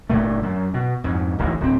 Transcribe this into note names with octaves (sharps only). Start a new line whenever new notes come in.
G1 G2 A#2 A3
F#2
B2
F2 G#2
D1 A1 D#2 E3
D1 C4